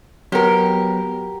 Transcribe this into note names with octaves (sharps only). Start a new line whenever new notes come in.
F#3 B3 G4 A#4